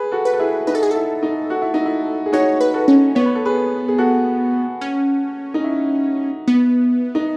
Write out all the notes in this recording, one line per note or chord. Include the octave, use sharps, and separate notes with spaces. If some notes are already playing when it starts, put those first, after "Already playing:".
Already playing: G#4 B4
F#4 A4
B4
A4
E4 G#4
D#4 B4
A4
G#4
E4 A4
D#4
F#4
E4
D#4
E4
G#4
D#4 F#4 C#5
B4
F#4 A4
C#4
B3 C#5
B4
A4
G#4 B4
G#4
F#4 A4
C#4
D#4
E4
B3
D#4